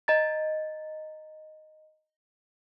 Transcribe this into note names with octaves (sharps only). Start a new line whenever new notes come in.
D#5 A#5 A6